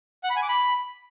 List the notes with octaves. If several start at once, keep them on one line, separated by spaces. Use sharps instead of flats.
F#5
B5
G#5
D6
B5